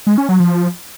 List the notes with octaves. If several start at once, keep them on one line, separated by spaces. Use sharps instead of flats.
G#3
C#4
F#3
F3